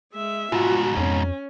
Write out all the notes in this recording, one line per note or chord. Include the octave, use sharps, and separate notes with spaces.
G#3 E5
G#2 B2 F4 F#4
F2 C#4